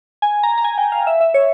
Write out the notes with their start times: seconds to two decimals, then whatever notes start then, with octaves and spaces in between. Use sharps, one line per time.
0.22 G#5
0.43 A#5
0.58 A#5
0.65 G#5
0.78 G5
0.92 F5
1.07 E5
1.21 E5
1.34 C#5